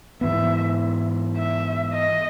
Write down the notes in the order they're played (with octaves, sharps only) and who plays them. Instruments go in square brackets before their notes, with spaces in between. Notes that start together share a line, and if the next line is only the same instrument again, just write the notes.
[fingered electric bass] G#2 E3 B3 [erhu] E5
[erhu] E5
D#5